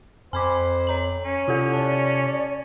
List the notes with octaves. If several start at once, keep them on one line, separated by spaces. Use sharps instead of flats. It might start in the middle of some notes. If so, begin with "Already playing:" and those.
F2 C5 G#5 B5 D6
C#5 A#5 F#7
C#4
C3 E4 F4 A4
D5 A5